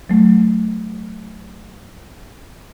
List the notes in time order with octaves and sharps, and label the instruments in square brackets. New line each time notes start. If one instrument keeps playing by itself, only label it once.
[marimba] F#3 A3